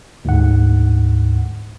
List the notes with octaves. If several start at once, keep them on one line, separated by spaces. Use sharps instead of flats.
D2 G#2 F#5